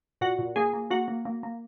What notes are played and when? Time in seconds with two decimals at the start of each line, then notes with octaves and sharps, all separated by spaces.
0.21 A#2 F#4 F#5
0.39 A#2
0.56 A#3 G#4 G#5
0.73 A#3
0.90 A#3 F#4 F#5
1.08 A#3
1.25 A#3
1.43 A#3